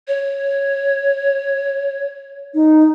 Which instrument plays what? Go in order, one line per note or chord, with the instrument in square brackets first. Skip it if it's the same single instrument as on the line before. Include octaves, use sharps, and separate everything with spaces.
[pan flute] C#5
[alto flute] D#4